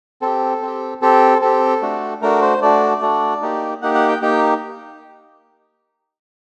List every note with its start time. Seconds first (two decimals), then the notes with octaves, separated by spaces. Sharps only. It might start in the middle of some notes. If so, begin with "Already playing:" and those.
0.22 C4 G4 A4
0.62 C4 G4
1.02 C4 G4 A4
1.42 C4 G4 A4
1.82 A3 D4 F#4
2.22 A3 D4 F#4 A#4
2.42 C5
2.62 A3 D4 F#4 D5
3.02 A3 D4 F#4
3.42 A#3 D#4 G4
3.82 A#3 D#4 G4 F#5
3.95 F#5
4.09 G5
4.22 A#3 D#4 G4 G5